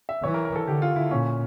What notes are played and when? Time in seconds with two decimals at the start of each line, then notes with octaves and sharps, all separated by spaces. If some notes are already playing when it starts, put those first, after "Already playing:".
0.09 E5
0.23 E3 C#5
0.34 A#4
0.45 A#4
0.56 A4
0.67 D3 G4
0.82 F4
0.96 E4
1.11 A#2 C#4